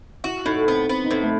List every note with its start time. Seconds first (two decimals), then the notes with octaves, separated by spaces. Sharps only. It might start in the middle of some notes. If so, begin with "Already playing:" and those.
0.24 E4 F#4
0.45 A2 D#4
0.67 B3 C4
0.89 B3 C4
1.05 D#4
1.10 A2 C4
1.23 A3